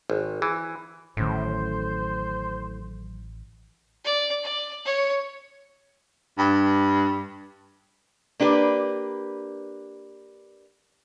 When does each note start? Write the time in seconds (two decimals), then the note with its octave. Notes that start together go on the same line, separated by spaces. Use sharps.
0.10 G#1
0.42 E3
1.17 A1 A2 D3 D#3 F#3 C#4 C5
4.05 D5
4.44 D5
4.85 C#5
6.38 G2
8.40 A#3 D4 G4 B4